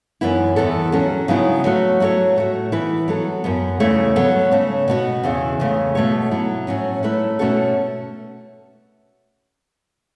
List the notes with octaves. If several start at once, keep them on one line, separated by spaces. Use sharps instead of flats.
F#2 E3 B3 E4
E2 E3 B3 A4
F#3 C#4 A4
C#3 F#3 B3 E4
F#3 A3 F#4 B4
F#3 A3 F#4 A4 C#5
A2 A3 F#4
E3 B3 E4 B4
F#3 B3 A4
F#2 F#3 B3
E2 C#3 A3 E4 C#5
F#3 B3 A4 C#5
C#3 A3 C#4
B2 B3 F#4
E2 C#3 E3
E2 C#3 A3
B2 A3 F#4 C#5
F#3 B3 E4
A2 F#3 C#4
F#3 A3 E4 B4
B2 A3 C#4 F#4 A4